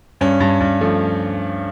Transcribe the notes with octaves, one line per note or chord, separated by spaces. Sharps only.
G2 C#4
G2
G2
F3 A3